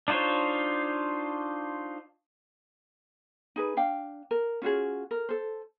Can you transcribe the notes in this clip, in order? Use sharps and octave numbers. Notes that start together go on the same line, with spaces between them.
D4 D#4 F4 C5 C#5
D#4 G#4 B4
D4 F5 G5
A#4
C#4 F4 F#4 G#4
A#4
A4 C5